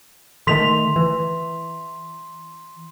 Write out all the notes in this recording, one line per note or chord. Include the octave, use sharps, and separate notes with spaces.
D3 D#3 A3 C6 B6 F7
E3